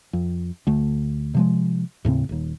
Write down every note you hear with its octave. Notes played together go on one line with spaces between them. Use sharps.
F2
D2 A3
C3 F3 G#3
D#2 A2 C#3 C4
D#1 D#2